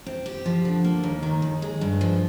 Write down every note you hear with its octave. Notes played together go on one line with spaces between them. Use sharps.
C4
G4
F3
D3
A#3
D#2
D#3
D#2
G#3
G2
F3